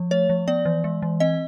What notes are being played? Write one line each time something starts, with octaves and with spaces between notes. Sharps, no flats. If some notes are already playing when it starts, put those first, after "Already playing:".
Already playing: F3
A3 C#5
F3
B3 D5
E3
G#3
E3
C4 D#5